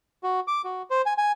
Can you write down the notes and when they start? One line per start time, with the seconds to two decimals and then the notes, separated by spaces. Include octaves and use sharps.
0.23 F#4
0.48 D6
0.64 F#4
0.90 C5
1.06 G#5
1.18 G#5